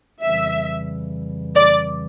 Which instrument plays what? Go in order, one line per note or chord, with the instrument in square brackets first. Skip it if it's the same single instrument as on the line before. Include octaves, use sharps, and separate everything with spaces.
[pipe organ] F2 C#3 E3 G3 [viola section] E5
[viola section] D5